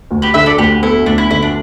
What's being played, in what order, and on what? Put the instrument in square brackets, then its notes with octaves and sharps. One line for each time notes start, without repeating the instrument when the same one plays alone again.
[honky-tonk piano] D2
[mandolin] G4 B4
[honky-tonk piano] D3 [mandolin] B4 E5
[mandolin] A4 D5
[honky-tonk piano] D2 [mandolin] G4 B4
[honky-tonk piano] B3 [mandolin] E4 A4
[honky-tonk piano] D2 [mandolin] D4
[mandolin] E4
[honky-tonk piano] D3 [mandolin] E4
[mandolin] D4